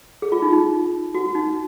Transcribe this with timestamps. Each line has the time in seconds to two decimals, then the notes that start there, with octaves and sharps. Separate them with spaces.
0.22 G#4
0.32 F4
0.42 D#4
0.52 D#4
1.14 F#4
1.35 D#4